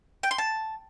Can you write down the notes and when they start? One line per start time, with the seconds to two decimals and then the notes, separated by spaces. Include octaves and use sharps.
0.23 G5
0.31 C6
0.38 A5